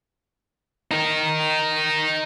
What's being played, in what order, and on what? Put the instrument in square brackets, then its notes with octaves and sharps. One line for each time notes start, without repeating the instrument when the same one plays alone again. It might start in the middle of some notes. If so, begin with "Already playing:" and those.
[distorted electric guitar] D#4 A#4